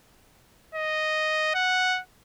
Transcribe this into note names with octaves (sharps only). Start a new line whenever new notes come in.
D#5
F#5